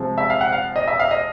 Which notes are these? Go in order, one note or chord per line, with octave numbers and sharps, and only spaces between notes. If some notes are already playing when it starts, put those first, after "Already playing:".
Already playing: C3 F3 G#3
E5
F5
F#5
F5
D#5
E5
F5
D#5